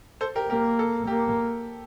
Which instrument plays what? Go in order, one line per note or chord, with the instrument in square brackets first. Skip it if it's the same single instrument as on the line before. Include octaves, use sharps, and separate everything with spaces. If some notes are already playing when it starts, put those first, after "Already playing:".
[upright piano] A4 C5
G4 A#4
[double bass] A#3 [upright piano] G4 A#4
[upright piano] A4
[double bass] A#3 [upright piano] G4